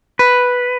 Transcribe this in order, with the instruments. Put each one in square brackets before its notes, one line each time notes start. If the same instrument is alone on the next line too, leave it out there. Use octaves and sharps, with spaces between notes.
[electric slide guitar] B4